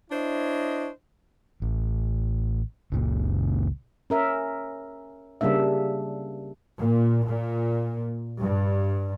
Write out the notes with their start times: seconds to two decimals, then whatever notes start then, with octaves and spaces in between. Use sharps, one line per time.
0.11 D4 E4 C5 C#5 D#5
1.62 A1
2.92 F#1 C#2 A#2
4.10 C#4 A#4 E5
5.41 C#3 G3 A#3 D4 E5
6.78 A#2
7.26 A#2
8.38 G2